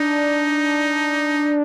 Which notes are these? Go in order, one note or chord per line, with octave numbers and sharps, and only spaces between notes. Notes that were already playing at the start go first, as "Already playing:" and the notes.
Already playing: D4 D#4